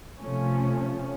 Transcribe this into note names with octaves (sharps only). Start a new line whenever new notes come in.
C3 F3 A3 C#4